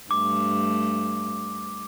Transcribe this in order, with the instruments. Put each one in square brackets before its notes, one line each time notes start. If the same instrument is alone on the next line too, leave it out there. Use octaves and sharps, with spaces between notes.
[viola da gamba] G2 A3 [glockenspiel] D6